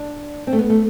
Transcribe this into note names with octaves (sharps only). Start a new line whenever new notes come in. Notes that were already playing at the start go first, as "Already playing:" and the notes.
Already playing: D4
C4
A3
B3
A3